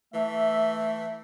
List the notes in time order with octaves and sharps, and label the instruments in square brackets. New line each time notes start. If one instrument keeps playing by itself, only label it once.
[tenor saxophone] E3 [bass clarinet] A3 [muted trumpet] E5